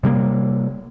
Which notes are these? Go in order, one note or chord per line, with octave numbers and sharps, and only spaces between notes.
C3 G3 G#3 A#3